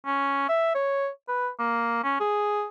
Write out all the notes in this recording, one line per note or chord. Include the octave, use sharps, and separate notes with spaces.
C#4
E5
C#5
B4
A#3
C#4
G#4